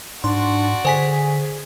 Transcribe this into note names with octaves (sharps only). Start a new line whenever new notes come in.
G#2 D4 F#4 D5 C6
D3 G#4 C5 G#5 B6